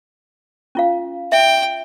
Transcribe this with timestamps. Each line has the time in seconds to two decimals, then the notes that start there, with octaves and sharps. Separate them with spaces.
0.75 C#4 F4 F5
1.32 E5 G5